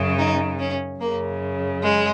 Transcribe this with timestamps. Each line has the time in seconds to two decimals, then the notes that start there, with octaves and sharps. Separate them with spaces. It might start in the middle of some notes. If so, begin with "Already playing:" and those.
Already playing: F#2 C#3
0.18 D#4
0.59 C#4
1.00 F#2 C#3 A#3
1.83 G#3